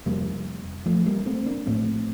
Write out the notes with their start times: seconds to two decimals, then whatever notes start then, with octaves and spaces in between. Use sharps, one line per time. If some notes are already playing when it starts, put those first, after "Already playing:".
0.06 F1 F2 C3 G3 A#3
0.86 F3 A3
1.06 G3 A#3
1.26 A3 C4
1.46 A#3 D4
1.66 A#1 A2 A3 C4